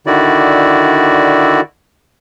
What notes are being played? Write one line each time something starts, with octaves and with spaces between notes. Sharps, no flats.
D3 D#3 E4 F#4 D5